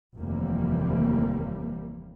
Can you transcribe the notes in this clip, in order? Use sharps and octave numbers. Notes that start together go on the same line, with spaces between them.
F1 D#2 E3 G3 A#3 C4